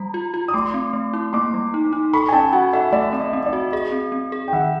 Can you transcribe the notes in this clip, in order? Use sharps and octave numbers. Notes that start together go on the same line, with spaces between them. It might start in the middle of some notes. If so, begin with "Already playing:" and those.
Already playing: G3 A#5 B5
F4
F4
D#6
A3 C6 D6
C4
A3
E4
A#3 C6 D6
G3
D#4
D#4
A4 B5 C#6
G#5
C#4 G5 A5
F#4 F#5 G#5
A4 E5 F#5
A3 D5 E5
C4
D#5
C4
D5
F#4
G#4 D#5
C4
C4
G#4
G5
D#3 E5 F#5